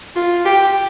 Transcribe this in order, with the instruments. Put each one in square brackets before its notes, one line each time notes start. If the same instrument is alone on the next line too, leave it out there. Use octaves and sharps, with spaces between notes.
[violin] F4
G4